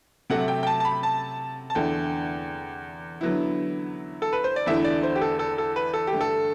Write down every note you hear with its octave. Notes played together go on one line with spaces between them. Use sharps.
C3 F#3 A3 F#5
G5
G5
A5
A5
B5
A5
A5
E2 D3 A3 G5
D3 F#3 B3 E4
A4
B4
C5
D5
E2 D3 A3 E4 E5
D5
C5
G4
A4
A4
A4
B4
A4
G4
G2 D3 A3
A4